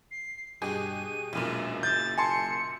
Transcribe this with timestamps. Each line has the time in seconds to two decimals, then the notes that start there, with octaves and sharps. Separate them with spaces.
0.11 C7
0.62 G2 B2 G4 G#4 D#7
1.33 E1 B1 F#2 A#2
1.83 F#1 G6 A6
2.18 G#5 A5 C6 C#7